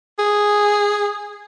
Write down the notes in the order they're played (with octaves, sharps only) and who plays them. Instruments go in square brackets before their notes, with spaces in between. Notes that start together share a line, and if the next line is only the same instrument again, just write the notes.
[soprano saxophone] G#4